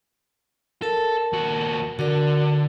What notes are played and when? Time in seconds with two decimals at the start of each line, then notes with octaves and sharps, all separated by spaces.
0.82 A4 A#4 A5
1.33 D#2 F#4
1.99 D3 F#4 A#4 D5